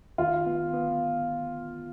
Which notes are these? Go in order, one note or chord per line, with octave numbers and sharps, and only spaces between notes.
D#3 F4
B3
B3